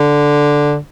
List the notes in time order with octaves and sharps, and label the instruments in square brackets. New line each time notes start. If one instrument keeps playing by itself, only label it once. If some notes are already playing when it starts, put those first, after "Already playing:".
Already playing: [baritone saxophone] D3